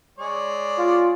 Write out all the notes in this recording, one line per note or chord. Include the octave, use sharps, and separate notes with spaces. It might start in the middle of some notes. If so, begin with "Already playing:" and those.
G#3 C#5 D5
F4